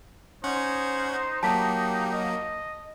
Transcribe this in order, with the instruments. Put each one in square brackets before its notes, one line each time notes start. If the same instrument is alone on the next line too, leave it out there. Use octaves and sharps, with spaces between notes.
[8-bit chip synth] C#4 F#5 G#6 [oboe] D#4 [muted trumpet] C5
[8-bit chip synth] F#3 A#3 [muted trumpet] G4 [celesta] A5 B6
[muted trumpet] D#5